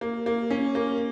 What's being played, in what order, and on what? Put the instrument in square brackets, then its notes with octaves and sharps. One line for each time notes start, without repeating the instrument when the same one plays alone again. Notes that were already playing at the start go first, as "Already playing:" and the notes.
[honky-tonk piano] A#3
A#3
C#4
A#3